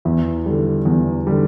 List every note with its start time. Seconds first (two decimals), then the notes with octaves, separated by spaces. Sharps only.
0.05 E2 E4
0.46 D3 G3
0.85 E2
1.27 D3 G3